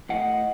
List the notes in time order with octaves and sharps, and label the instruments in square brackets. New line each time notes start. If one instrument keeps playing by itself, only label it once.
[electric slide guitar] A2 D#5 F#5